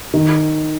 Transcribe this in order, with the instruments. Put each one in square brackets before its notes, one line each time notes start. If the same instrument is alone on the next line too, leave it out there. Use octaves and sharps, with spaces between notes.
[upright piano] D#3